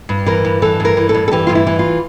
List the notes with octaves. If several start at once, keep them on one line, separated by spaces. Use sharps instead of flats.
G2
E3 A#4
G2
E3 A4
G2 A#4
E3
A4
G2
A4
E3 G4
G2 F4
E4
E3
F4